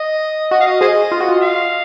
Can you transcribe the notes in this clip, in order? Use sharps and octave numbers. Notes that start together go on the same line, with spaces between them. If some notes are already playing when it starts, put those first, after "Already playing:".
Already playing: D#5
F#4 D#5
F5
D#5
G#4 C5 D#5
F4
F#4
F4
F5